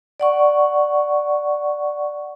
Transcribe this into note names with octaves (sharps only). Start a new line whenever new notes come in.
D5 F#5 C#6